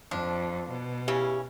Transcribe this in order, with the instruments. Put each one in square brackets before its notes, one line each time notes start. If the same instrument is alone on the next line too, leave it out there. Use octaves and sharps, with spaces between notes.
[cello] F2 [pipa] F3 D4
[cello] B2
[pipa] C#3 E3 C#4 [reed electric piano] G4